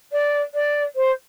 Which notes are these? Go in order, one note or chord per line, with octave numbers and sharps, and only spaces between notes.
D5
D5
C5